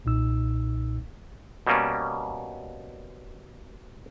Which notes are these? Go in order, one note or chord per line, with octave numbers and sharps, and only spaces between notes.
B1 A#2 D#4 E6
B2 G3 A#3 C#4